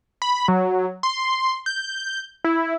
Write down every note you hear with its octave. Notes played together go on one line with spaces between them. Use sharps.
B5
F#3
C6
G6
E4